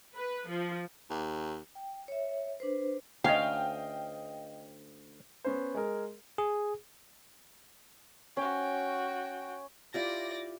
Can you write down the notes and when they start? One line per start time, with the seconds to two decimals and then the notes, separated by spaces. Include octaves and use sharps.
0.16 B4
0.48 F3
1.10 D#2
1.75 G5
2.08 C#5 E5
2.60 D4 B4 C5
3.24 D2 C#4 D#5 F5 G5
5.45 B3 C#4 C5
5.74 G#3 G#4 A#4
6.38 G#4
8.37 C#4 F#4 G5
9.94 E4 F4 G4 D5 A#6